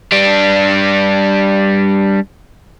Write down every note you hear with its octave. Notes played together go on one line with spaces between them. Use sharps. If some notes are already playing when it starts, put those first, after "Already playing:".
G3 D4